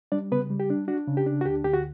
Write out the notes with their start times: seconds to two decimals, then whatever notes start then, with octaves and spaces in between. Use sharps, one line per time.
0.12 G3 D4 D5
0.32 C#3 B3 B4
0.50 G3
0.60 G4
0.70 D4
0.88 D4 F#4
1.07 C#3
1.17 G4
1.26 D4
1.41 F#4
1.46 D2 G4
1.64 D2 G4
1.74 F#4